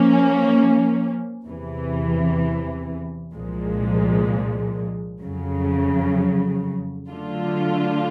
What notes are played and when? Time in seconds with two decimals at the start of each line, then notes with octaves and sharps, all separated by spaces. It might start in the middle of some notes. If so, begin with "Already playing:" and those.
Already playing: F3 A#3 C#4
1.46 E2 C3 E3
3.34 C2 A#2 F3 G#3
5.22 F2 C#3 F#3
7.10 D3 F#3 A3 D4 F4